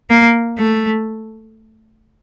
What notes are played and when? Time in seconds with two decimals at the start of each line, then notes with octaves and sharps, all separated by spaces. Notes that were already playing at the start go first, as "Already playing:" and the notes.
0.10 A#3
0.59 A3